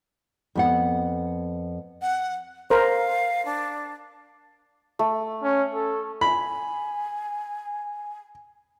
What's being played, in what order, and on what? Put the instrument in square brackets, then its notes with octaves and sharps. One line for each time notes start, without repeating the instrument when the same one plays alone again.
[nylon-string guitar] F2 B3 F#5
[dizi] F#5
[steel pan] A#4 C5 [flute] F5
[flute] D4
[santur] A3
[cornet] C#4
A4
[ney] G#5 [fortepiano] B5